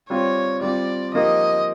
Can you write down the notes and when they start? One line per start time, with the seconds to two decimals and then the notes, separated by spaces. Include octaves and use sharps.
0.10 G3 C4 F4 C#5
0.61 G3 C4 F4 D5
1.14 F3 A#3 D#4 G4 D#5